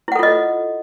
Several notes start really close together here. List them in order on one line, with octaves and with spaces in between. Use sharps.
E4 F#5 A4 F4 D#5